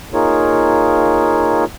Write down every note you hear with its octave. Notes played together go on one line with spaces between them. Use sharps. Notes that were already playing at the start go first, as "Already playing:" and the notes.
A#3 D#4 F4 G#4 A#4 C#5